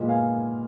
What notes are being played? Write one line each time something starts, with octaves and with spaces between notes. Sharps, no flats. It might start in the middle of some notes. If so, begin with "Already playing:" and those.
Already playing: A#2 G#3 B3
F5 G#5